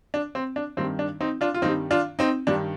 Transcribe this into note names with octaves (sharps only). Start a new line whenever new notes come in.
D4
C4
D4
G2 D#3 G3 C4
D4
C4 D#4
D4 F4
F4
G2 D#3 G3 C4 D#4
D4 F4
C4 D#4
G2 D#3 G3 D4